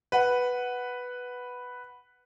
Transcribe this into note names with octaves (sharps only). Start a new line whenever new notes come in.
B4 F#5